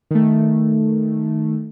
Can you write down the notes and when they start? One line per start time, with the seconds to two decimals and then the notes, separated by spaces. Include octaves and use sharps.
0.11 D#3 A3